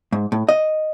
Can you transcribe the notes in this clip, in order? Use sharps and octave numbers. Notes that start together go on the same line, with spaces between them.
G#2
A2
D#5